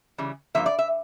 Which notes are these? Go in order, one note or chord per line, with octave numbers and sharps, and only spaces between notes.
C#3 E3 G3
G2 F3 A#3 E5
D5
E5